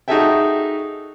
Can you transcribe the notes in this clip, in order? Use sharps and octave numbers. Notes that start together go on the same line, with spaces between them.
D#4 F#4 G#4 A4 E5 G5